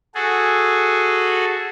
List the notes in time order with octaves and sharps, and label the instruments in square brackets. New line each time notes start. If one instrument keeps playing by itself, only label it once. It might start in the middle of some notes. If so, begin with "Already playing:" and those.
[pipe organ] F#4 G#4 A4